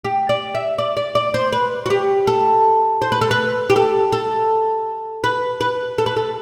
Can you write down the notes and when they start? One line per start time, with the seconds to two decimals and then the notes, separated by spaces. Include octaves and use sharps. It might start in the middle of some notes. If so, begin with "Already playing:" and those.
0.05 G4
0.29 D5
0.55 E5
0.78 D5
0.97 D5
1.15 D5
1.34 C5
1.53 B4
1.86 F#4
1.90 G4
2.27 A4
3.02 C5
3.12 B4
3.21 A4
3.31 B4
3.70 G4
3.76 A4
4.12 A4
5.24 B4
5.61 B4
5.98 A4
6.06 B4
6.16 A4